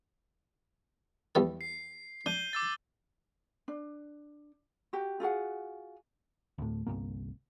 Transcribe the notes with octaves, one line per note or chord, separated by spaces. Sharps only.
E2 G3 A4
C7
D4 G6 D#7 G7
D6 E6 A6
D4
F#4 G4
F4 F#4 G#4 F#5
D2 A2
G1 C2 G2 A#3